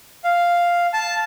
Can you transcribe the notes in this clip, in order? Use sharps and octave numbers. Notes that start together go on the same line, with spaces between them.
F5
A5